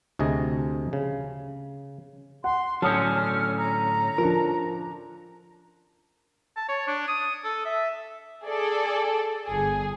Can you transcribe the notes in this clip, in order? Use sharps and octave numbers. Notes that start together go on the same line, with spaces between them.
D2 C3 G#4 D#5
C#3
F#5 C6
A2 D3 F#3 C#4 A5 D#6 F6 G6
A#5
F3 D4 A#4
A5
C#5
D4
D#6
A4
E5
G#4 A4 D5
G1 G#4